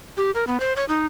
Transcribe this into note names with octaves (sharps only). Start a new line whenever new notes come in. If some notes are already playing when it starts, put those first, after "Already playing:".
G4
A#4
B3
C5
C#5
D#4